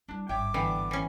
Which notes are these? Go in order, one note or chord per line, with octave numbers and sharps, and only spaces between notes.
G3 D4 E4
G#1 G2 C#5 E5 G5 D6
D3 E3 B3 G5
E3 C#4